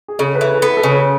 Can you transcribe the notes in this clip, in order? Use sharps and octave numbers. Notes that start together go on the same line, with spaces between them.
G#4
C#3 A4
G#4
B4
E3 A4
A4
B3 A4
A4
C#3
A4 C#5